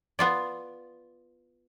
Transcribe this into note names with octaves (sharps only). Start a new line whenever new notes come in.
B3 F4 D5